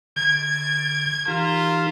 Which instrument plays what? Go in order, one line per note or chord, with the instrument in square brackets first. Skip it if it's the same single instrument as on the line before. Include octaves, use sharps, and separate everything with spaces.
[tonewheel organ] D3 [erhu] G#6
[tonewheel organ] E3 D#4 G4 [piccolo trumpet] F4 [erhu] A#4